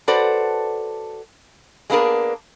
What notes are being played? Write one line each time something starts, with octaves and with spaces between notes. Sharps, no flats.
F#4 A4 B4 C5 D5
G#3 A#3 B3 D4 G#4 A#4